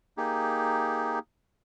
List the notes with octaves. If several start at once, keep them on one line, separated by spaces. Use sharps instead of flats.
A#3 D#4 G4 G#4